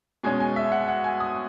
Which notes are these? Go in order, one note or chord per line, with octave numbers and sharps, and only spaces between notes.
B2 G#3 C#4 G#5
G#5
E5
F#5
F#5
G#5
D#6